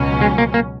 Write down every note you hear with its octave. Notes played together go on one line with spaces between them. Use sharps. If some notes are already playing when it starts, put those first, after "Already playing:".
Already playing: C#2 B2 F#3 C#4
G#3
A#3
A#3